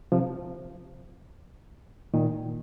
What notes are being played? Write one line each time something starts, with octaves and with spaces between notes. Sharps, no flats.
C3 F3
A#2 D#3